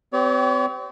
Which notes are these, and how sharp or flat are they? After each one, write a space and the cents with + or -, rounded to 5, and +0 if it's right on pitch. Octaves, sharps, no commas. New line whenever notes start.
C4 -35 G4 -25 C#5 +45